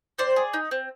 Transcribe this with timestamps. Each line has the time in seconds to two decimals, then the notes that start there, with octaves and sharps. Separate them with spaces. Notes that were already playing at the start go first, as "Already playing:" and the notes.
0.18 C4 C5 D5
0.36 G#4
0.53 D#4
0.71 C4